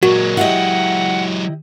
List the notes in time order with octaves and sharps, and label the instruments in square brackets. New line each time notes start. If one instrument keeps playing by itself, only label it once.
[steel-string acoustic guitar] A#2 [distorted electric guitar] F#3 G#3 [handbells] F#4
[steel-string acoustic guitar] E4 G4 D#5 [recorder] F#5